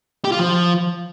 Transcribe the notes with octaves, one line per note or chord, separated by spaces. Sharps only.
G4
F4
F3